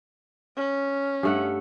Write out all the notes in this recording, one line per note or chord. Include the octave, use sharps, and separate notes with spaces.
C#4
G2 A3 F#5